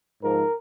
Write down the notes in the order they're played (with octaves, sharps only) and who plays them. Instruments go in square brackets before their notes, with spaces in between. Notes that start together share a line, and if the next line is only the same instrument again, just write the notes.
[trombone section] G#2 F3 A#4